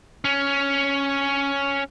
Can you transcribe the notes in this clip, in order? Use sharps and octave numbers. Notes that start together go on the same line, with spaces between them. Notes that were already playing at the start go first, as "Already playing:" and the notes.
C#4